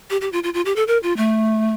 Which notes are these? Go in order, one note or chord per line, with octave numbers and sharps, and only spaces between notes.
G4
G4
F4
F4
F4
G4
A4
A#4
F4
A3